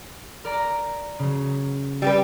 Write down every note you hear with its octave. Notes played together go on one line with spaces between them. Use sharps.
A#4 D5 A#5
C#3 F#3
G3 G4 B4